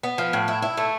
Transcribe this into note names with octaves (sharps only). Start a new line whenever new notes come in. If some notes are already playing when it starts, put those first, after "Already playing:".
B3
F3
A2
E4
E4
A3